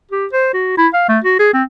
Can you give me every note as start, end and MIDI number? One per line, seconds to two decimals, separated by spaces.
0.12 0.26 67
0.33 0.50 72
0.54 0.73 66
0.78 0.87 64
0.93 1.05 77
1.09 1.19 57
1.24 1.39 66
1.39 1.53 68
1.54 1.63 60